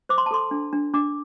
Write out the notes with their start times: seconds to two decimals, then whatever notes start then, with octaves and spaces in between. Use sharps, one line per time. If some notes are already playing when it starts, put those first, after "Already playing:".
0.09 C5 D6
0.18 C6
0.26 A5
0.31 A4 C6
0.51 D4
0.73 D4
0.94 D4 D6